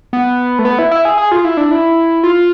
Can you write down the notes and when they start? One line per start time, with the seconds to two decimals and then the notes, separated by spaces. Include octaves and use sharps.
0.13 B3
0.59 A3
0.65 B3
0.79 E4
0.91 E4
1.05 G#4
1.18 G#4
1.32 F4
1.44 E4
1.57 D4
1.71 E4
2.23 F4